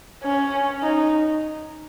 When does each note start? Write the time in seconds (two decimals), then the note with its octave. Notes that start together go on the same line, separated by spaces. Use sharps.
0.24 C#4
0.82 D#4